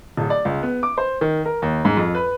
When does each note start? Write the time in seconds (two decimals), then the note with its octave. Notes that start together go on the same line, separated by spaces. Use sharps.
0.17 D1
0.30 D5
0.45 C#2
0.63 B3
0.83 D6
0.98 C5
1.21 D#3
1.45 A#4
1.62 D#2
1.85 G#2
1.97 F2
2.15 B4